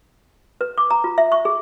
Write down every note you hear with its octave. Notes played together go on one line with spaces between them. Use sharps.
B4
D6
A#5
F4
E5
C#6
G#4